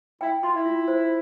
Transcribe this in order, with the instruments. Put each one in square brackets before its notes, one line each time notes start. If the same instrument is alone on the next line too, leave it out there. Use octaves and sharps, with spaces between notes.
[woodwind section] E4 [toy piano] G5
[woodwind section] F4 [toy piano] C6
[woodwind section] E4
[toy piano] F4
C5